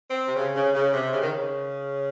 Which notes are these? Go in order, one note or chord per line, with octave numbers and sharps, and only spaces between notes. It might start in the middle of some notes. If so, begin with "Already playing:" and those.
C4
C3
C#3
C#3
C#3
C3
C#3
D#3
C#3